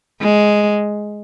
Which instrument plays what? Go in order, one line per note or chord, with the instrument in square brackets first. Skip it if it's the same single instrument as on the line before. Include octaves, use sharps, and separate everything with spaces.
[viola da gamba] G#3